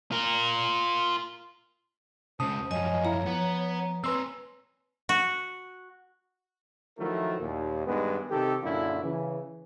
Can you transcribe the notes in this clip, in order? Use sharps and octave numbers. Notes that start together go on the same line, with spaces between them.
F4 A#4
C#2 C#3 C5 A5 D#6
F#2 F3 C#5 D#5 G#5
E4 F5 A#5
F3 B3
C4 B4 C#5 C6 E6
F#4
D#3 F3 F#3 A3 E4 A#4
D#2 A#2
G2 D#3 G#3 B3
C3 D#3 G4 A4
F#2 A#2 D3 D4 E4 F4
C#3 E3